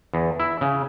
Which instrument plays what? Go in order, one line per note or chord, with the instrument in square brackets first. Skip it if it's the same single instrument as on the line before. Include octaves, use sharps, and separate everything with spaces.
[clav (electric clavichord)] E2
E4
C#3